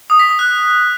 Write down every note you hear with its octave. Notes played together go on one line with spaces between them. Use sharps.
D#6
B6
D#6
F#6